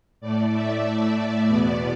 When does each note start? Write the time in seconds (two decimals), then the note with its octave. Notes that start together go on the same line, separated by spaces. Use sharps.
0.21 A2 A3 D5
0.53 E5
0.85 E5
1.48 E2 B2 B3 D5